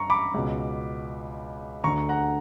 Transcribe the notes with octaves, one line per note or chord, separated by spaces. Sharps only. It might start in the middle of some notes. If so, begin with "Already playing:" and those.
Already playing: G2 A#5 C#6
B5 D6
C#2 B2
D2 D3 A#5 C#6
F#5 A#5